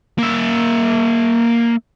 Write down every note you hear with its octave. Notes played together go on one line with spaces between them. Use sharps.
A#3 E5